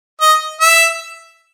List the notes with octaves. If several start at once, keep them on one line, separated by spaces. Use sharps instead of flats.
D#5
E5